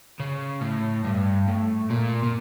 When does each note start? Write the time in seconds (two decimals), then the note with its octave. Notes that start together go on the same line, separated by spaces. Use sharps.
0.20 C#3
0.62 A2
1.04 G2
1.48 A2
1.90 A#2
2.23 A#2